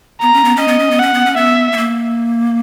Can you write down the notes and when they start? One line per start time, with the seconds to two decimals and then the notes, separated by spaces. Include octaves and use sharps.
0.22 B3 A#5
0.33 C#4
0.44 B3
0.57 C#4 D#5
0.68 B3
0.79 C#4
0.91 B3
0.99 C#4 F#5
1.14 B3
1.26 C#4
1.37 B3 E5
1.72 B3
1.77 A#3